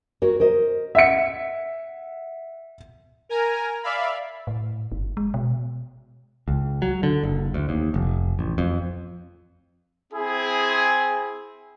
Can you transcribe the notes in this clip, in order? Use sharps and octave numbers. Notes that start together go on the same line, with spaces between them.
F#4 A#4 C#5
A#4 C5 D#5
E5 F#5 C#7
A#4 G#5 A#5
D5 E5 F5 B5
A2
G1
G#3
B2
C#2
F#3
D3
F#1
D2
D#2
F1
A1
F2
C4 E4 G#4